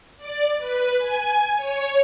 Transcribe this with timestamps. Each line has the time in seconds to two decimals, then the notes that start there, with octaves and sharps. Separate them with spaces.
0.17 D5
0.58 B4
0.98 G#5
1.56 C#5